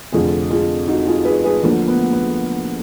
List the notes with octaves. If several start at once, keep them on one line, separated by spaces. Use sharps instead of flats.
F1 F2 D3 F4 G#4
F4 G#4
D#4 F#4
F4 G#4
G#4 B4
G#4 B4
D2 D3 F3 A#3 D4
B3
B3